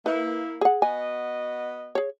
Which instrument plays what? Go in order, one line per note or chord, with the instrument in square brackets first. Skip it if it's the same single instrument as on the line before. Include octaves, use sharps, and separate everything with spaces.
[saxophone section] A#3 E4 [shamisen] B4
[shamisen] G#4 F#5
[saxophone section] B3 F#4 D#5 [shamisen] G#5
[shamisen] G#4 C#5